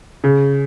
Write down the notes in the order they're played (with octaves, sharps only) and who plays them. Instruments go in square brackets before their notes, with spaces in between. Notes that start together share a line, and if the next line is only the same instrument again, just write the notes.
[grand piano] C#3